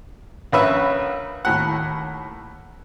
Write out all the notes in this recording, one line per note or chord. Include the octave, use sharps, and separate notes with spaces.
A#1 C#4 B4 E5
D#2 A2 F#5